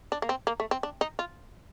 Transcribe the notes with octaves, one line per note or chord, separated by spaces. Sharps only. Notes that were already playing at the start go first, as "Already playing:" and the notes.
D4
A#3
C4
A#3
A3
C4
D4
D#4
F4